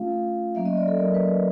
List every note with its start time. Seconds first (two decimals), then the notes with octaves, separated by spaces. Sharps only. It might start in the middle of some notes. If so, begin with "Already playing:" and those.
Already playing: A3 C#4 F4 F5
0.10 A3 C#4 F4
0.55 F#3 A#3 C#4 E5
0.65 D#5
0.77 D5
0.88 A4
0.99 F#3 A#3 C#4 A#4
1.14 B4